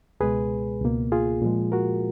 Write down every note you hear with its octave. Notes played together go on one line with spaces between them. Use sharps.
C#2 B2 G#3 G#4 B4
C#2 B2 A#3
F4 G#4
A#2 F3 G#3
F#4 A#4